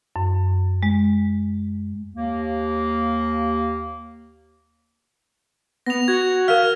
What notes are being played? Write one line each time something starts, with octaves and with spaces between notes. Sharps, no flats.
F#2
G#3
D#2 A#3
B3 A#6 F7
F#4 G#6
A#4 F5 F6